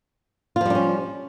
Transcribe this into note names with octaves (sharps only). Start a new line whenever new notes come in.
F3 G3 C#4 D4 F4